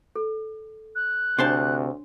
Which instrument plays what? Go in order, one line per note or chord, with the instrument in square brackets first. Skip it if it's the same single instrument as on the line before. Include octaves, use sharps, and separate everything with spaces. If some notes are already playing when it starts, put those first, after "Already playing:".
[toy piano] A4
[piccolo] F#6
[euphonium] D2 [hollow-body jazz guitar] C3 C5 A5 [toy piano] D4 C#5 C6